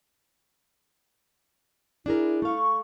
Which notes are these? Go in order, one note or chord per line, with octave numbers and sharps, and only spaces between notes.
D4 E4 G#4 A#4
A3 F5 C#6